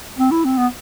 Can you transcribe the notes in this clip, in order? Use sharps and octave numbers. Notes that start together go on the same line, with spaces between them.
C4
E4
C4
B3